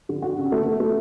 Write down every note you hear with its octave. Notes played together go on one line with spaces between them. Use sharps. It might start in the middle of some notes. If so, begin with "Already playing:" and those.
D3
F#4
C#3
A3
A3
A3